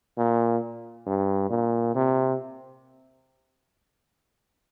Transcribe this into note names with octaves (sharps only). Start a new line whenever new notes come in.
A#2
G2
A#2
C3